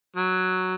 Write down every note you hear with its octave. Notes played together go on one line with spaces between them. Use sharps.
F#3